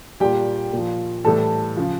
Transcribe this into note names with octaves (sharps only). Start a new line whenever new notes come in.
A#2 G3 G4 G5
A#2 F3
A2 E3 G3 A4 A5
C#3 F3